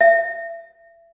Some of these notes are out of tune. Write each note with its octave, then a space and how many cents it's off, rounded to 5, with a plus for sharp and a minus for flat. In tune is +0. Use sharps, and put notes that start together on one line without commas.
E5 +30